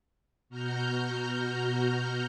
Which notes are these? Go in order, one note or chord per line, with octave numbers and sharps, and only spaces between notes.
B2 F#4 A#5 F6 G6